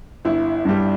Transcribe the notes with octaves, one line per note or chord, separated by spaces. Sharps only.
G1 E4
G2 G3